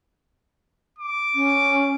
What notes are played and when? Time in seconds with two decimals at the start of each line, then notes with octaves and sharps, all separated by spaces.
0.98 D6
1.35 C#4